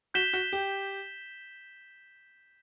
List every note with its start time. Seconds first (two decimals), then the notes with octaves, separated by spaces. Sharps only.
0.14 F#4 G6 B6 E7 G7
0.33 F#4
0.53 G4